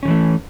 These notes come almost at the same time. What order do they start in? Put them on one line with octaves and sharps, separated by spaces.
C#4 D#3 E3 A3